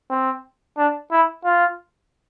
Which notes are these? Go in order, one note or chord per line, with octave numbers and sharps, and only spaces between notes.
C4
D4
E4
F4